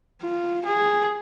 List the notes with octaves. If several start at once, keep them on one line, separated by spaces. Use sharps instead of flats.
F4
G#4